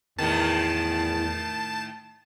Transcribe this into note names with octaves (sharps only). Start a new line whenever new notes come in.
E2 A2 D#3 A5